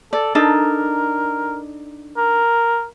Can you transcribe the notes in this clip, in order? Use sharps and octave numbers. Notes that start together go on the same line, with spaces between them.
A4 D5
D4 D#4 A4 A#4
A#4